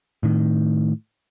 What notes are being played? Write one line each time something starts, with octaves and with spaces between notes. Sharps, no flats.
A2 D#3